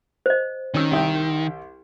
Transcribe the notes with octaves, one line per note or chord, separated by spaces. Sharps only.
C5 D#5
D#3 C#4 E6
C2 E5 G5